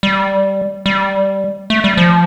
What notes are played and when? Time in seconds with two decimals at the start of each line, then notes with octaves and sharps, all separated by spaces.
0.03 G3
0.86 G3
1.70 A3
1.84 G3
1.97 F3